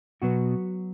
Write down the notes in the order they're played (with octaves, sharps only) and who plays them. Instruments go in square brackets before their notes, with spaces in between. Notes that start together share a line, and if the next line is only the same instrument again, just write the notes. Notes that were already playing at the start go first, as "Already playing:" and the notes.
[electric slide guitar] B2 [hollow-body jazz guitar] F#3 B3 F#4